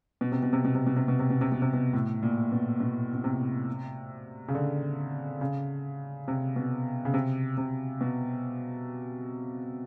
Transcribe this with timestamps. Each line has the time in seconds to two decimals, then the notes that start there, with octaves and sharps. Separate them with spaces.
0.21 B2
0.32 C3
0.42 B2
0.53 C3
0.65 B2
0.75 C3
0.87 B2
0.96 C3
1.08 B2
1.19 C3
1.30 B2
1.41 C3
1.52 B2
1.62 C3
1.73 B2
1.93 A2
2.22 A#2
2.52 B2
2.80 B2
3.14 B2
3.24 C3
4.48 C#3
4.55 D3
5.41 C#3
6.28 C3
6.56 B2
7.05 C#3
7.14 C3
7.57 C3
8.01 B2